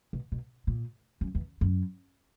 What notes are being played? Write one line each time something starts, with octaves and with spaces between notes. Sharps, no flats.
B2
B2
A#2
F#2
E2
F#2